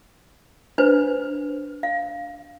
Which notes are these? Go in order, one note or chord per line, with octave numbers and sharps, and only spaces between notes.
D4 B4 C5
F5